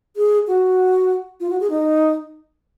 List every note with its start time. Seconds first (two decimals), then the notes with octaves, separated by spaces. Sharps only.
0.17 G#4
0.48 F#4
1.40 F4
1.50 F#4
1.60 G#4
1.70 D#4